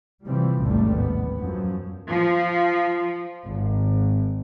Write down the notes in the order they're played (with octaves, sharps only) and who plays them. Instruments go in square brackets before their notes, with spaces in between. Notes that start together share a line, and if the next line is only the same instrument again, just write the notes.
[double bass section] C3 E3 F3 G3 C4
A1 D#2 G#2 C3 G3 A3
B3
F#2 F3
[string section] F3
G#1